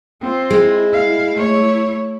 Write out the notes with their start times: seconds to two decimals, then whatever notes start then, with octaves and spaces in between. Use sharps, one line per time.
0.21 C4 F4
0.50 G#3 E4
0.93 F5
1.33 A3 C#5